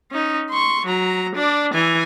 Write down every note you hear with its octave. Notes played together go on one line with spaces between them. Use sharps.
C#4 D#4
C6 C#6
F#3 A#5
D4 D5
E3 G#5